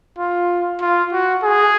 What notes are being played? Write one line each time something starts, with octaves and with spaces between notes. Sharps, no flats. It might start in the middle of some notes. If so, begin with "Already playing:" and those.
F4
F4
F#4
G#4